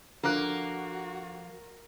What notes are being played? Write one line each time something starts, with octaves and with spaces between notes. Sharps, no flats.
D3 F3 A#3 F#4 F#6